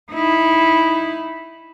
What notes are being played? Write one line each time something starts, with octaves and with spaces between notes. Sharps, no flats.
D#4 E4